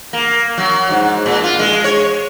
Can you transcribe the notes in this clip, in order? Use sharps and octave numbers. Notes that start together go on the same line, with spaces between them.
A#3
F#3
G#2
A#2
F4
G#3
C#5